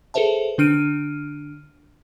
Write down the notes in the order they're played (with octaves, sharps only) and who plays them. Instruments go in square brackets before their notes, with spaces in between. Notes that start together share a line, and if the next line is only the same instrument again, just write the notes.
[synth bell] G#4 A4 B4 C5 E5 A5
D3 D4 F6 D7 D#7